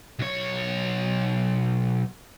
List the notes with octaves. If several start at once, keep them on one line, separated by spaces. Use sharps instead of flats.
B1 C#5